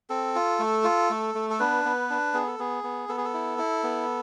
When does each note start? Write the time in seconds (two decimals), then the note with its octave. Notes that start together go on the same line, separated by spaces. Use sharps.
0.10 C4 A4
0.35 F4
0.59 A3
0.84 F4
1.10 A3
1.35 A3
1.50 A4
1.60 B3 D4 B4
1.85 B3
2.10 D4
2.34 B3 G#4
2.47 A4
2.59 B3 G#4
2.84 B3
3.09 B3 A4
3.17 G#4
3.24 A4
3.34 E4
3.58 E4
3.84 B3